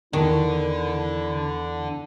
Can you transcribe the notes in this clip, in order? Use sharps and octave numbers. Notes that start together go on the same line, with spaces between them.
E2 D#3 E3 D4 E4 A4